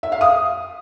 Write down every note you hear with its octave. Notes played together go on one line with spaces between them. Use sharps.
E5
F5
D#6